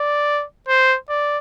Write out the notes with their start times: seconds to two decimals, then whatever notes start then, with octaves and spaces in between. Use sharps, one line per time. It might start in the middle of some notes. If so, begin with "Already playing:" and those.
Already playing: D5
0.68 C5
1.09 D5